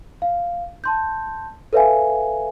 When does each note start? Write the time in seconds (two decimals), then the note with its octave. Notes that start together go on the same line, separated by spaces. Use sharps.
0.22 F5
0.84 A5 C6 G6
1.73 A4 B4 C#5 E5 F5 G#5